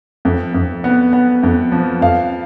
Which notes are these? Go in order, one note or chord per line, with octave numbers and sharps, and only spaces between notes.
F2
F2
B3
B3
F2
F3
F2 F5